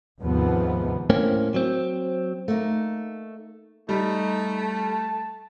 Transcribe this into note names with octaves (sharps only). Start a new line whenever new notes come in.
D#2 G#2 C3 F3 B3
A2 A#3 C4 C#4
F#3 C4
A3 A#3 D#4
G3 A3 D#4
A5